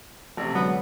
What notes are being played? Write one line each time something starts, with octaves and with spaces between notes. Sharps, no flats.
A1 C3
D3 F#3 G#3 B3